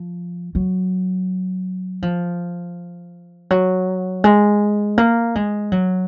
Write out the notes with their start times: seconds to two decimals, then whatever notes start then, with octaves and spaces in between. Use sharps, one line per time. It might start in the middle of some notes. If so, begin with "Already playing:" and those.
Already playing: F3
0.55 F#3
2.02 F3
3.50 F#3
4.24 G#3
4.98 A#3
5.35 G#3
5.72 F#3